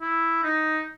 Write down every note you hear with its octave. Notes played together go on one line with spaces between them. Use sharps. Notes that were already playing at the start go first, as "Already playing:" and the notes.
E4
D#4